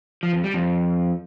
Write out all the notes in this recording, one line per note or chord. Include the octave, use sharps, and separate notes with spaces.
F3
F2
G3
F2